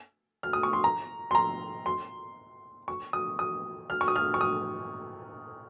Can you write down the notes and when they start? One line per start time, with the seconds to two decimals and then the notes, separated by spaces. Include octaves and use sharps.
0.43 F6
0.53 D#6
0.63 C#6
0.73 C6
0.84 A#5
1.31 C6
1.35 A#5
1.86 C6
2.88 C#6
3.13 D#6
3.39 D#6
3.90 F6
4.01 C#6
4.08 D#6
4.16 F6
4.34 C#6
4.41 D#6